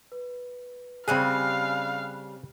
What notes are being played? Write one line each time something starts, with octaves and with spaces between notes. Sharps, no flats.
B4
C#3 G3 C4 G#4 F5 G#5 B5 F#6